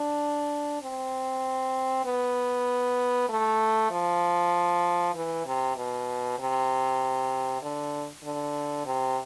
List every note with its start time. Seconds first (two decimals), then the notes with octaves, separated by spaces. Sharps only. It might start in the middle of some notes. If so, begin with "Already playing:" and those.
Already playing: D4
0.82 C4
2.05 B3
3.29 A3
3.91 F3
5.15 E3
5.46 C3
5.76 B2
6.39 C3
7.62 D3
8.24 D3
8.86 C3